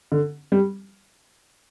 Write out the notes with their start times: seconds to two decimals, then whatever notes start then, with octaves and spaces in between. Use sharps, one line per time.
0.12 D3
0.52 G3